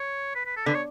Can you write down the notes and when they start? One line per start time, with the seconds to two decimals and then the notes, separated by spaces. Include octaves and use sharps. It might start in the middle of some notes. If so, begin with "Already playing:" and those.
Already playing: C#5
0.35 B4
0.46 B4
0.57 A4
0.66 D3 B4
0.74 C#5